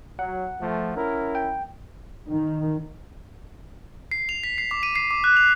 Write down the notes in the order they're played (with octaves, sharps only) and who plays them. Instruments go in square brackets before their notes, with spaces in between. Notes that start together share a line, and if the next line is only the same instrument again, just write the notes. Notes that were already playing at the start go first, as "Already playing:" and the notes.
[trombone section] F#3 [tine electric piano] F#5
[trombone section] F3 A3
C#4 E4 A#4
[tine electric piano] G5
[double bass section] D#3
[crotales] C7
F7
B6
C7
D6
D#7
C7
D6
F#6
F7